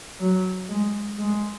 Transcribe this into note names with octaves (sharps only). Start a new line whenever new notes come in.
F#3
G#3
G#3